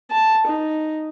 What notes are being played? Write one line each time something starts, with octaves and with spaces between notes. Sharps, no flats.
A5
D#4